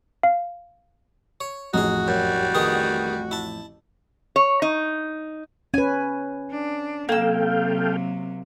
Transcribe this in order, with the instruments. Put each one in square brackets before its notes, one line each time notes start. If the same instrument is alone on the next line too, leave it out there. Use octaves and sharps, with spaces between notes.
[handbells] F5
[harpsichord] C#5
[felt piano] A1 F2 [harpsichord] D#4 G#4 [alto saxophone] F#4
[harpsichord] F#2 [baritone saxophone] G3
[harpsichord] D#3 B3 G#4
E4 A5
[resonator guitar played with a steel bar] C#5
D#4
[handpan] C#4 B4 [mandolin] G#5
[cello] D4
[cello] C3 F#3 [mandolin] A#3 E6 [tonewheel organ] A4 F5 G5